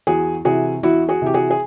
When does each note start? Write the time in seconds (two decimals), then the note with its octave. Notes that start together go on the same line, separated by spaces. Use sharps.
0.07 E2 F#4 G#4
0.45 C3 E3 F#4 G#4
0.83 E2 E4 F#4
1.09 F#4 G#4
1.22 C3 E3 G4
1.34 F#4 G#4
1.51 G#4